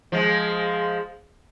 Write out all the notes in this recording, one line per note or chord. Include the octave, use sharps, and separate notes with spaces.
F3 G#3